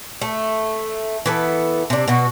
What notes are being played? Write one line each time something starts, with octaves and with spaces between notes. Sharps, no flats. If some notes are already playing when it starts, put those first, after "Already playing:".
A3
E3 B3 A4
C3 D4
B2 F#4